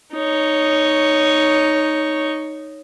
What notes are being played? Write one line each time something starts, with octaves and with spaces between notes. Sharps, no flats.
D#4 C#5